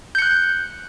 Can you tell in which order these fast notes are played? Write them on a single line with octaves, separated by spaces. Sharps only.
G6 C#7 F#6